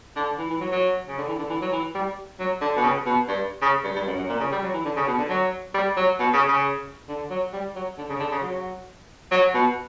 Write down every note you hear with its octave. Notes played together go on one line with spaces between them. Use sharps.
D3
E3
E3
F#3
F#3
C#3
D3
E3
D3
E3
F#3
E3
G3
F#3
D3
B2
C#3
B2
G2
C#3
G2
G2
F#2
F#2
A#2
C#3
G3
F#3
E3
D3
C#3
B2
D3
F#3
G3
F#3
B2
C#3
C#3
D3
F#3
G3
F#3
D3
C#3
D3
C#3
F#3
F#3
B2